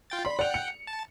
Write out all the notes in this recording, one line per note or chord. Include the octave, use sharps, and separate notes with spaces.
F4 G5 A6
D5 B5 C6
D5 F#5 G5 F7
C#7
A5